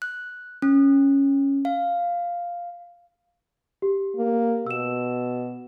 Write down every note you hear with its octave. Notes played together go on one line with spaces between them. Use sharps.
F#6
C#4
F5
G4
A#3
B2 E6 E7